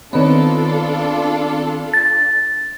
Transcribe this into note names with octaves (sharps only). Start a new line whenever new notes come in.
D#3 B3 C4 D4 D#4 F4 A4 C#5
A6